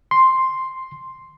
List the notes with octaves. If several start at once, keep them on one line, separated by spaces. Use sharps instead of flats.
C6